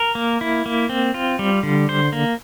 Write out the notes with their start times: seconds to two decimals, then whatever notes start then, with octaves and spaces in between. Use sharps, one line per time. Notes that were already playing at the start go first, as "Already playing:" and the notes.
Already playing: A#4
0.15 A#3
0.41 E4
0.66 A#3
0.89 C4
1.14 F4
1.39 G3
1.63 D3
1.89 C5
2.12 A#3